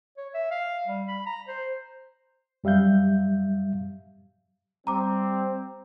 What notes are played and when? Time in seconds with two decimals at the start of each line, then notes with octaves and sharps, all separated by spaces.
0.17 C#5
0.34 E5
0.51 F5
0.87 G3
1.08 B5
1.26 A#5
1.48 C5
2.64 F#2 G3 E5 F5 G6
4.87 G3 C4 A#5 D6